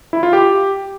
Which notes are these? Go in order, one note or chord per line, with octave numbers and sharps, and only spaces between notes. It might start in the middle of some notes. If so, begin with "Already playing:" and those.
E4
F4
G4